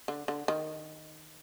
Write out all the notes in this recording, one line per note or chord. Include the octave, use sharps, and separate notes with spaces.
D3
D3
D#3